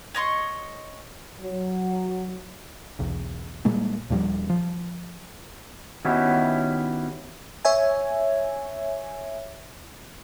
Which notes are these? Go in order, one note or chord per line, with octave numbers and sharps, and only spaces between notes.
C#5 D#5 C6 C#6
F#3
B1 E2
A#2 G3 G#3 A#3
D#2 A#2 F3 G3
F3
D#3 B3 C#4 E4 F#4 G4
C#5 E5 G#5